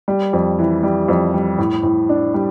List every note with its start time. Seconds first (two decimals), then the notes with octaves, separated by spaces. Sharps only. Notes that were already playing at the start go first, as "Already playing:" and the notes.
0.08 G3
0.33 F2
0.59 E3
0.83 G3
1.09 F2
1.34 G3
1.58 A2
1.83 A2
2.09 D4
2.34 G3